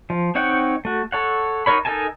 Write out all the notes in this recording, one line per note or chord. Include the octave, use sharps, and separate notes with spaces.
F3
C4 D#4 C#5 F#5 G5
A3 F#4
A4 C#5 F#5
D#4 F#4 A#4 C#5 B5
D#4 A4 A#4 G#5 A5